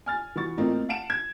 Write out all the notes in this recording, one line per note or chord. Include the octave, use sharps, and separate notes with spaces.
G#5 F6 A6
E3 B3 F#4 C#6 A6
A2 A3 A#3 C4 D#4 F4
F5 F#5 A5 D7 E7
G#6